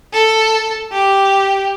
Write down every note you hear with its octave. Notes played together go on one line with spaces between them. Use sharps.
A4
G4